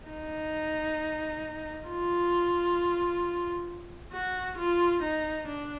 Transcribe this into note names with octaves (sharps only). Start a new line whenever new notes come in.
D#4
F4
F#4
F4
D#4
D4